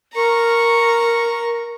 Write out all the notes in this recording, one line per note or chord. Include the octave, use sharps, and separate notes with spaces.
A#4 A#5 C#6